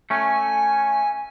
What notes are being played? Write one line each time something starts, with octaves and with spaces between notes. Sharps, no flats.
A3 C#4 G#5